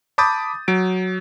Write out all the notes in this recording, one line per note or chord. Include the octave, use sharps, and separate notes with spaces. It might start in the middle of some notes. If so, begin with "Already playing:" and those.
A5 B5 D6 D#6 G6 A6
F#3 D7